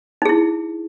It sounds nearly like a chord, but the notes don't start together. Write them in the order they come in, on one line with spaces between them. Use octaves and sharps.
D#4 G#4 E4